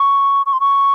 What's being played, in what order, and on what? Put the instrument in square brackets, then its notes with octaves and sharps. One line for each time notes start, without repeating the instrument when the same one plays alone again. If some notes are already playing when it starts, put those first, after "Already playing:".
Already playing: [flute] C#6
C#6
C6
C#6